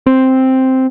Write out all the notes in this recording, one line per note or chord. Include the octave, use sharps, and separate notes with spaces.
C4